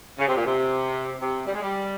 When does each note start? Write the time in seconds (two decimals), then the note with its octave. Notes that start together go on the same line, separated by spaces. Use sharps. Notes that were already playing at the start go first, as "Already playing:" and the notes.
0.18 C#3
0.27 C3
0.37 A#2
0.46 C3
1.20 C3
1.47 G3
1.54 G#3
1.62 G3